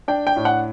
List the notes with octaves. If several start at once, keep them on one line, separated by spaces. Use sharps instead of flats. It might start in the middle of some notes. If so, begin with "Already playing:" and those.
D4 G5
G5
A2
F#5